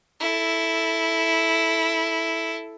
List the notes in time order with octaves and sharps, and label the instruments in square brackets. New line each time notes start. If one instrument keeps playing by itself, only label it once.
[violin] E4 A4